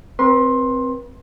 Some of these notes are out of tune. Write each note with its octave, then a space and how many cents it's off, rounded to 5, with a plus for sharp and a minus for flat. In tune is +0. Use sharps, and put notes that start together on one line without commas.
C4 +0 B4 -35 C6 +15